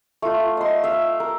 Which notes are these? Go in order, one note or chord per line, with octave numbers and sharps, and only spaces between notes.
A3 F4
D#5 C6
E5 F5
A#4